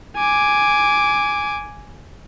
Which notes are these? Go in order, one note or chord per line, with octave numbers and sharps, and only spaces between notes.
G#5 D6